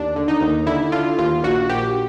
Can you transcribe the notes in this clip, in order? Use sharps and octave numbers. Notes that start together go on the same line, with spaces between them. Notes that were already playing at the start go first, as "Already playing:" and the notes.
Already playing: D#2 D4
D3
D#4
D#2
D3 E4
D3 F4
D#2 F4
A#1 F#4
A#1 G4